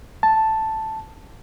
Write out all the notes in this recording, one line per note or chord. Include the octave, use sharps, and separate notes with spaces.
A5